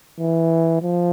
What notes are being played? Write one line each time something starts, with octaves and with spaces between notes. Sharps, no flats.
E3
F3